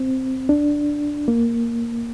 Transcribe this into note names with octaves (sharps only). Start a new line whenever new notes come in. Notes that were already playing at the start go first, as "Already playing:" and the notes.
Already playing: C4
D4
A#3